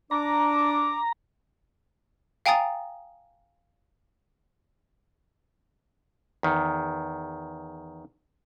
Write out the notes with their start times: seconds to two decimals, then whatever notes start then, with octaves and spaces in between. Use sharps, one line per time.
0.11 D4 A#5 D6
2.46 F5 G5 G#5 A#5 D#6 A6
6.43 E2 D#3